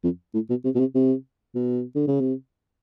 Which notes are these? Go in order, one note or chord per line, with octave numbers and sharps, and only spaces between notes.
F2
A2
B2
C3
B2
C3
C3
B2
D3
C#3
C3